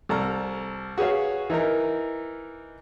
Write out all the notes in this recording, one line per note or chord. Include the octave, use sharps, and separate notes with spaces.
C2 A4 A#5 F6
F#4 G#4 B4 C#5 F5
E3 D#4 A#4